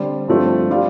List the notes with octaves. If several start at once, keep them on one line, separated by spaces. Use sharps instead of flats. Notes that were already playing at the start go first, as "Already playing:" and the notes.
Already playing: D3 G3 C4
G2 F3 A3 C4
G3 F4